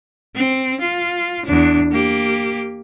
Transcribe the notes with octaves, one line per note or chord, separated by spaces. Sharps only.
C4
F4
E2 D4
A#3 G4